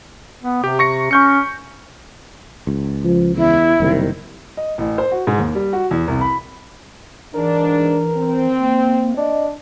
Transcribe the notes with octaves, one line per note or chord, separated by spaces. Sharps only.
B3
C3 G4
C#6 A#6 C#7
C#4 C#6 G6 C#7
C#2
F3
E2 E4
F#1 C2 D#3
D#5
A1
C5
F#4
G#2
D#2
G3
F#4
E2
C2
B5
G#2 E3 D4 A#4
C4
A#3
D4 D#5